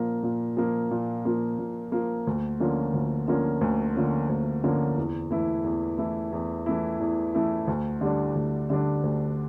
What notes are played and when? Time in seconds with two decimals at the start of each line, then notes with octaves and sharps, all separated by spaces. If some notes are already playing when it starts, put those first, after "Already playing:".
Already playing: A#2 F3 A#3
0.23 A#2
0.57 F3 A#3
0.91 A#2
1.25 F3 A#3
1.59 A#2
1.92 F3 A#3
2.27 D2
2.60 D3 F3 A#3 C#4
2.93 D2
3.28 D3 F3 A#3 C#4
3.61 D2
3.96 D3 F3 A#3 C#4
4.29 D2
4.64 D3 F3 A#3 C#4
4.98 E2
5.31 E3 A3 E4
5.64 E2
5.98 E3 A3 E4
6.32 E2
6.66 E3 A3 E4
7.00 E2
7.35 E3 A3 E4
7.67 D2
8.01 D3 G3 D4
8.35 D2
8.70 D3 G3 D4
9.03 D2